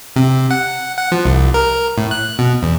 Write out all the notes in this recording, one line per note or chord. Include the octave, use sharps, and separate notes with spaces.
C3
F#5
F#5
F3
C2
A#4
A2
F#6
B2
E2